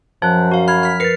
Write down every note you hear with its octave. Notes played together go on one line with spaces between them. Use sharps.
F#2 F3 C5 A5 F#6
F#4 F5
B5 F6 G#6
F6 B6
A#4 B4 A6 C7 C#7